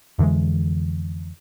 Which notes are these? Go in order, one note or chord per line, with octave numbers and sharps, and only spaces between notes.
F2 D3 E3 G#3